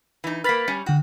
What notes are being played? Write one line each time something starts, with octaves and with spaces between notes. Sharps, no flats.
E3 D#4
A#3 B4 F6 A6 B6
G3 C#4
D3 F#4 G5